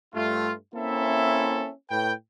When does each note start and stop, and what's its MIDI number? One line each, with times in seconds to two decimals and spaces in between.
0.15 0.53 43
0.15 0.53 57
0.15 0.53 65
0.75 1.71 58
0.75 1.71 60
0.75 1.71 61
0.75 1.71 64
0.75 1.71 69
0.75 1.71 76
1.90 2.14 45
1.90 2.14 71
1.90 2.14 79